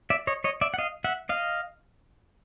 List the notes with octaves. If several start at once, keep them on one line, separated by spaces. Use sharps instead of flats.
D5 E5
C#5 D#5
C#5 D#5
D5 E5
F#5
D#5 F5
E5 F#5
D#5 F5